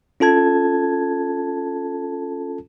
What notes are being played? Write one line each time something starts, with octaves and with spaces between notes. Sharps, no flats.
C#4 F4 A4 A5 G#6